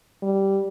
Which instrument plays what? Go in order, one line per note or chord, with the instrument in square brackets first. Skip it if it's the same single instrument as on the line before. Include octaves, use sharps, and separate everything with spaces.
[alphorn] G3